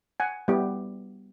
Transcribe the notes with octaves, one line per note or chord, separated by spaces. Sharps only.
F#5 G#5
G3 B3 E4 G4